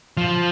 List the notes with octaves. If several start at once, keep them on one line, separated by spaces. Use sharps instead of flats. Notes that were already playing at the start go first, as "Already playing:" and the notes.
F3